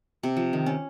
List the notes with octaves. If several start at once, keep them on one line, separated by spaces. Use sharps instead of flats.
C3
F3
D#3
C#4